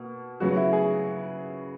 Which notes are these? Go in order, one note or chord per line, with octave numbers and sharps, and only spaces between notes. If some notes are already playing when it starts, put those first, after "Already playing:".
Already playing: B2 A#3
C#3 F#3 B3 F#4
E4
G#4